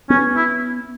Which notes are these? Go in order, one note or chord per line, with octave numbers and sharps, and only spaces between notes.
B3 C#4
E4